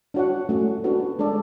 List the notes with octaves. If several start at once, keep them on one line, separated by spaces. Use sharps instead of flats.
D4 F#4 C#5 F#5
A3 C#4 F#4
B3 D4 F#4 B4
G#3 D4 A4 D5